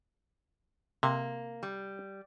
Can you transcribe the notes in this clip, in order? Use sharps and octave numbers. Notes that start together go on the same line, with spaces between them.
C3 A#3
G3